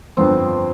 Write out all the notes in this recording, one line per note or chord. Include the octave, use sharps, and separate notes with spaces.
G1 F2 D3 F3 B3 C4